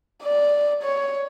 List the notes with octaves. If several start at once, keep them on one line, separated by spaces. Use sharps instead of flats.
D5
C#5